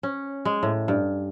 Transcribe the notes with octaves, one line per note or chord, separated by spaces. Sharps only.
C#4
G#3
A2
G2